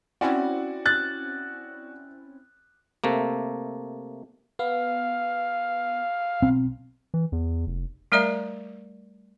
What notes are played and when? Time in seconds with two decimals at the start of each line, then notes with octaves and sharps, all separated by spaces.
0.21 C4 C#4 E4 F#4 D5 F#5
0.86 F#6 A6
3.04 C3 A3 A#3
4.59 B3 F5
6.42 B1 C4
7.14 E3
7.32 E2
7.67 F1
8.12 G3 A3 A#4 D5 E5 A#5